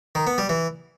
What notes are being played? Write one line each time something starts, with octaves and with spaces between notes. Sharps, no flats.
D#3
B3
G3
E3